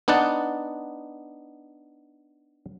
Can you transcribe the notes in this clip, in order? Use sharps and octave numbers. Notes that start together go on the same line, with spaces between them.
B3 D4 D#4 F#5 A5